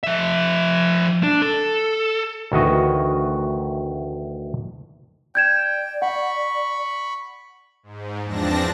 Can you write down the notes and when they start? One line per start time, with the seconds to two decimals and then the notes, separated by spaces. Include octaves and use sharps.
0.03 F3 E5
1.23 D4
1.42 A4
2.52 D2 D#3 E3 F#4 D#5
5.35 D5 G5 G6 G#6 E7
6.02 F#5 B5 C#6
7.83 G#2
8.24 E2 F3 C4 D4 A5 A#6